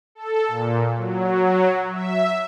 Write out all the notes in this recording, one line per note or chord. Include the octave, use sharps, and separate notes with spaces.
A4
A#2
F#3
E5